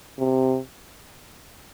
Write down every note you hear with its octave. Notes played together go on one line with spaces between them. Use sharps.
C3